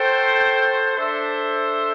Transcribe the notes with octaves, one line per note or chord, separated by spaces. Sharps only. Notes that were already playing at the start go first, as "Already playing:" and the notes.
Already playing: F#4 A4 C5 G5
D4 A4 C5 E5